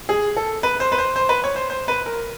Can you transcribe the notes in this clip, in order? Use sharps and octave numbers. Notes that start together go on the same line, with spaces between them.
G#4
A4
B4
C5
B4
C5
C5
B4
C#5
C5
C5
B4
A#4